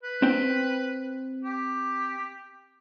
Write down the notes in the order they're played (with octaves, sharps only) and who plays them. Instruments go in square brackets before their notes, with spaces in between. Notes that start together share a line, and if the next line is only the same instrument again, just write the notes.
[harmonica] B4
[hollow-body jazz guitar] C4 G5
[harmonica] G4